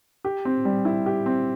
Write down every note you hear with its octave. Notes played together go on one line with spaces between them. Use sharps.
G4
C4
G3
E4
G4
C4